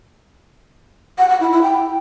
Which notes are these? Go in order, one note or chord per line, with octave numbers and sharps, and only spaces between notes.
F#5
F#5
E4
E4
G5